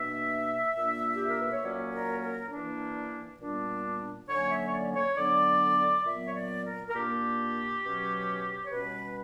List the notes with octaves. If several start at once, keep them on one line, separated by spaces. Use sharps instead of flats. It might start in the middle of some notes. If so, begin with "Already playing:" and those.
Already playing: B2 A#3 D4 E5
A#2 A#3 D4
G4
A#4
B4
C#5
A#2 F#3 A#3 C#4 D5
A#4
A#4
E3 A#3 D4
A#2 G3 B3 D4
D3 F#3 A#3 C#4 C#5
E5
C#5
D5
C#5
D3 F#3 B3 D4 D5
A#2 F#3 B3 E5
C#5
D5
A#4
A#4
A#2 A#3 D4 G4
B2 F#3 C#4
C#5
B2 G3 C#4 B4